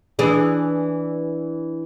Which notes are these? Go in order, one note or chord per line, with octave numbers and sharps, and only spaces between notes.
E3 D4 G#4